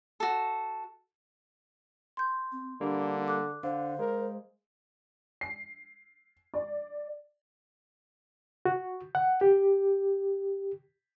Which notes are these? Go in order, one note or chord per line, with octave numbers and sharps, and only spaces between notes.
F#4 A4
C6 G6
C4
D3 G3 A#3 D4
A4 D6 F#6
D3 C5 F5
G#3 A#4
C7
D5
F#4
F#5
G4